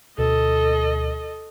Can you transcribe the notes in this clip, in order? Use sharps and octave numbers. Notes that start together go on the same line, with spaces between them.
D2 B2 A4 D#5